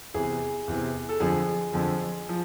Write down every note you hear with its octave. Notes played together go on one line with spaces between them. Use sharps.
E2 C3 E3 G#4
E2 C3 E3
A4
F2 D3 F3 G#4
F2 D3 F3
F3